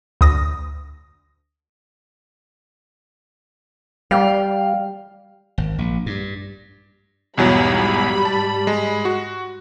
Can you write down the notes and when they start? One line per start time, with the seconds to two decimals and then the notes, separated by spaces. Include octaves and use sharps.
0.21 D2 D#6 A#6
4.11 G3 F5 G5
5.58 G#1
5.78 A#1
6.06 G2
7.38 B1 E2 G#2 F#3 G3 B5
8.25 A5
8.67 G#3
9.05 F#4